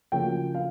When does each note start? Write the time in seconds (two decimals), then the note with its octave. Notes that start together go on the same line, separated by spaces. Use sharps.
0.12 D2 C#3 F3 A#3 C#4 G5
0.55 F5